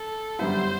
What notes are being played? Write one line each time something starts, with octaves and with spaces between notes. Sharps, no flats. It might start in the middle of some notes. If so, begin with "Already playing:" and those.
Already playing: A4
F#2 D3 G3 B3 E4 C5